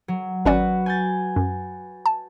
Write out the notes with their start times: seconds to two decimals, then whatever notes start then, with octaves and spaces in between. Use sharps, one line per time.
0.08 F#3
0.45 G#1 C#4 F#4 B4 D5
0.86 G#5 G6 A6
1.36 F#2
2.06 A5